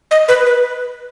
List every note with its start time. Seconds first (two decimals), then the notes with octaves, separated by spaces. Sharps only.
0.11 D#5
0.28 B4
0.46 B4